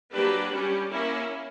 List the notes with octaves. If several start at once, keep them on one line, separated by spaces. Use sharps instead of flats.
F#3 A#3 D4 G4 B4
G3 C#4 G4
A#3 C#4 E4